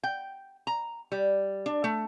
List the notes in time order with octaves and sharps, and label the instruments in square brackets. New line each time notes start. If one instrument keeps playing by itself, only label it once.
[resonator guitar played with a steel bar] G5
A#5
G3
D4
A3